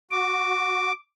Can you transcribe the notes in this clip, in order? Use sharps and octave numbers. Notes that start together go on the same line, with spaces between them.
F#4 D6